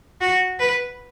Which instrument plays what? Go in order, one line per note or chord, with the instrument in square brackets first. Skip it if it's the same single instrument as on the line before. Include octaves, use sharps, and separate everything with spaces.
[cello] F#4
B4